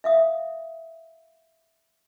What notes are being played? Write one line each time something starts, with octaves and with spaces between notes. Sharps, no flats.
E5 F5 D#6